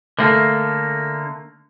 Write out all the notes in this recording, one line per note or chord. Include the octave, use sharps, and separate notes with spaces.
D3 A3 A#3